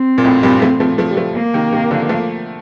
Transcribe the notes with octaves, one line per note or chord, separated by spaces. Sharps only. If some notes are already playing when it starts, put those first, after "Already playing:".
Already playing: C4
A#2
F2 A2
G2 A#2
F3 A3
F3 A3
F3 A3
G3
F3 A3
A#3
C3 D#3
C3 D#3
D3 F3
F3 A3